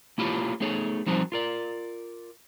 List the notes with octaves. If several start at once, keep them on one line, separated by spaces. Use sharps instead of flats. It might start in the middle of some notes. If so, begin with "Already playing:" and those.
A#3 E4 F4 G4 C#5
A3 B3 D#4 G#4 C#5
F3 G3 C4 D#4 F#4 C5
F4 A#4 D5